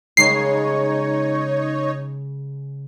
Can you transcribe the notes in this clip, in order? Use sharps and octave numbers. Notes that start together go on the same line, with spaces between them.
C#3 G#3 D#4 C#5 C7